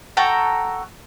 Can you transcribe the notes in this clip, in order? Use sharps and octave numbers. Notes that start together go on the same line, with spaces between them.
F#4 A4 G5 A#5